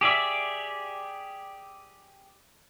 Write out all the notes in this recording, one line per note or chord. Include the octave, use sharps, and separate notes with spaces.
G4 G#4 D5 E5